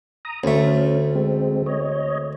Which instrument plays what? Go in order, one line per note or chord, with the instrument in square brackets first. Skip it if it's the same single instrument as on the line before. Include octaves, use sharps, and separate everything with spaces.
[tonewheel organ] A#5 D#6
[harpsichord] D2 A3 [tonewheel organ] C#4
[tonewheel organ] G#3 C4
C#5 D#5